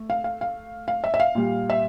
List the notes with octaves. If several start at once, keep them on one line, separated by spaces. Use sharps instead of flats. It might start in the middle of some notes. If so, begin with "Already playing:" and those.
Already playing: A3
F5
F5
F5
F5
E5
E5
F5
A#2 G3
E5